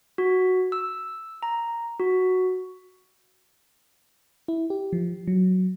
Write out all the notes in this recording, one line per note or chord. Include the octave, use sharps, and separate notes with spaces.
F#4
E6
A#5
F#4
E4
G4
F3
F#3